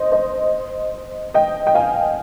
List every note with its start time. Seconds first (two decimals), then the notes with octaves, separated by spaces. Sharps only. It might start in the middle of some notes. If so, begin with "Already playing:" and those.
Already playing: C5 D#5
0.12 C5 D#5
1.34 D#5 G5
1.67 G5
1.75 F5 G#5